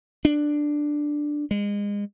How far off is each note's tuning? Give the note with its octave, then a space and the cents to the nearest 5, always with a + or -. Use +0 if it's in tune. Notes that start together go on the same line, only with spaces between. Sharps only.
D4 +5
G#3 -30